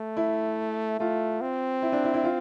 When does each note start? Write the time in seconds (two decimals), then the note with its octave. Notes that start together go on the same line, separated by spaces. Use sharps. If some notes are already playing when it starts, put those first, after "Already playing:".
Already playing: A3
0.17 E4
1.00 A3 F4
1.42 C4
1.82 E4
1.92 D4
2.04 E4
2.14 E4
2.24 F4